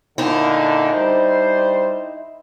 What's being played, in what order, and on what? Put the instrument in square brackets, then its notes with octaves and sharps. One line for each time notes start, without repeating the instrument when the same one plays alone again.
[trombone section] A#2 D3 [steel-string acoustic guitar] D#4 E4
[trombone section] G3 D4 C5